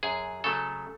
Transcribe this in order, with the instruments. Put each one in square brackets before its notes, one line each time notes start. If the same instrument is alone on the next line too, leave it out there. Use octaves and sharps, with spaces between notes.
[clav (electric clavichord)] F#2 G#4
C#3 F#3 A3 A4